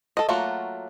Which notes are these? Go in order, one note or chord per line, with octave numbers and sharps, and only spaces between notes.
A4 D#5
F#3 A3 A#3 F4 F#4